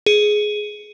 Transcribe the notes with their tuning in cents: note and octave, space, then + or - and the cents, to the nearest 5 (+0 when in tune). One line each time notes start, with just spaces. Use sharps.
G#4 +10